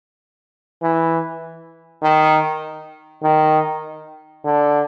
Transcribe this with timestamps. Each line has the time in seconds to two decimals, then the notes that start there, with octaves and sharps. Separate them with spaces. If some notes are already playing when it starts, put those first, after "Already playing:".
0.82 E3
2.02 D#3
3.23 D#3
4.44 D3